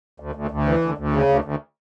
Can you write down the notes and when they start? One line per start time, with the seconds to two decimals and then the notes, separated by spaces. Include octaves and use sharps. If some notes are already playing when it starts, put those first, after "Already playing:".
0.20 D2
0.35 D2
0.51 D2
0.66 E3
0.82 D2
0.98 D2
1.13 C#3
1.29 D2
1.44 D2